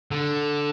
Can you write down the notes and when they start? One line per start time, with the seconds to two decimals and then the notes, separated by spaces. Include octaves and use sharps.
0.11 D3